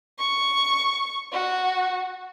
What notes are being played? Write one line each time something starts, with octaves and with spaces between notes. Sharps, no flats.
C#6
F#4